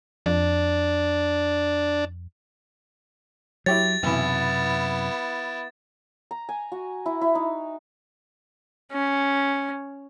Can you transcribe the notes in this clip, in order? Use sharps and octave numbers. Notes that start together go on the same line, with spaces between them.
F2 D4
F#3 E4 G4 C#5 A6
B1 F#2 C3 E3 B3 E4
A#5
G#5
F#4
E4
E4
D#4
C#4